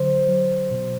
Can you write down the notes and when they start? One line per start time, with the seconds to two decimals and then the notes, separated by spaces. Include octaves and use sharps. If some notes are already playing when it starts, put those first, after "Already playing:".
Already playing: D3 F#3 C5
0.28 F#3
0.71 B2